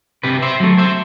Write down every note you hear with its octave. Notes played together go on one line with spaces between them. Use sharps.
C3 G4 B4
C5 E5
F#3 A3
C5 E5